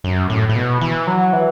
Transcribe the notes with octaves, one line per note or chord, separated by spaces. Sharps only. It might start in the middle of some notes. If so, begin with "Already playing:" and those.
F#2
A2
A2
B2
E3
F#3
E3